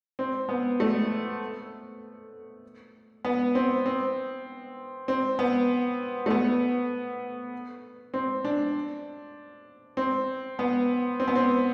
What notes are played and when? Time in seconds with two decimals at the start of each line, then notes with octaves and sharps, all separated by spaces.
0.19 C4
0.49 B3
0.80 A3
3.25 B3
3.55 C4
3.86 C4
5.08 C4
5.39 B3
6.26 A3
6.30 B3
8.14 C4
8.44 D4
9.97 C4
10.59 B3
11.20 C4
11.28 B3
11.35 C4